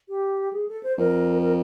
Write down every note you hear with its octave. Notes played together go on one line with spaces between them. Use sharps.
G4
G#4
A4
C5
F2 A#4
A#4